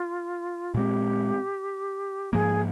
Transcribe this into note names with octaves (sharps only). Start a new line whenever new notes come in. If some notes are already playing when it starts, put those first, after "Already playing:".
Already playing: F4
A#2 G#3 C4 G4
G#2 F3 A#3 G#4